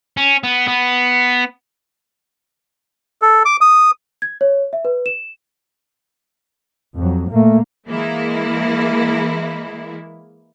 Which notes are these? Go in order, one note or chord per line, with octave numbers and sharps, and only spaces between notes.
C#4
B3
B3
A4
D6
D#6
G#6
C#5
E5
B4
E7
F2 F#3
A#2 A3 A#3
E3 G#3 A#3 E4